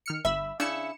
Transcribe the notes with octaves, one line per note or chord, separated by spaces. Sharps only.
D#3 F6 C#7
G1 E5 B5 E6
C#3 D4 E4 C#7 E7